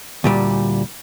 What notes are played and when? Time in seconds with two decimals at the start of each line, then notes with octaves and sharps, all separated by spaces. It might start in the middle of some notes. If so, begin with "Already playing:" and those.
0.24 D2 A#2 G3